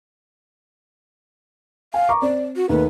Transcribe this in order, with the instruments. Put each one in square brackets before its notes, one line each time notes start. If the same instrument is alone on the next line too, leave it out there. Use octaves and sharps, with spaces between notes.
[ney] F5 [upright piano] G#5
[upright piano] A#5 C#6 D6
[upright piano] C4 [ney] D5
[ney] F#4
[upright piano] D#2 A3 [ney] B4